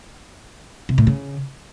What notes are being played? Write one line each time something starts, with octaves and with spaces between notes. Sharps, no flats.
C3
A2
C#3